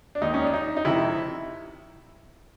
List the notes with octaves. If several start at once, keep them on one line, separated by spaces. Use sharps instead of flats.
D4
D#2 D#3 D#4
C#4
D4
D#4
D#4
F2 C3 D#3 E4